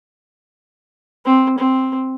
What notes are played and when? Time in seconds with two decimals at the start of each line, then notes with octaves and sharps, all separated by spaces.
1.26 C4
1.58 C4